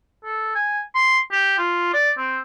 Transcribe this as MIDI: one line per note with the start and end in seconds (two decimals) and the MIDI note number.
0.25 0.52 69
0.55 0.81 80
0.95 1.18 84
1.32 1.58 67
1.58 1.90 65
1.94 2.11 74
2.18 2.39 60